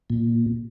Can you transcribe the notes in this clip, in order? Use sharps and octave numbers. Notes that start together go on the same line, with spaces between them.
A#2